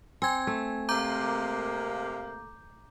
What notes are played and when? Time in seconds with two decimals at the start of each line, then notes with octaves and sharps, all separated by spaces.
0.22 C4 G#5 G#6
0.47 A3
0.89 C3 G#3 A#3 A#5 D6 G6